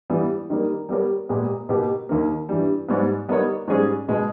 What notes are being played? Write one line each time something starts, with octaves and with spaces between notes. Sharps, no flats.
E3 G3 B3
D#3 G3 A#3
G3 B3 G4 A#4 C#5
A#2 G#3 B3 G4
B2 A#3 D#4 G4
D#2 D#3 A#3
G2 E3 G3
G#2 G3 B3
G3 B3 D#4 A#4 C#5
G#2 G3 C#4 G#4
B2 G#3